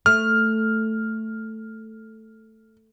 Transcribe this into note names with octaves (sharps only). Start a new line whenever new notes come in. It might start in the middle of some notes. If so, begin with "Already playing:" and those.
A3 F6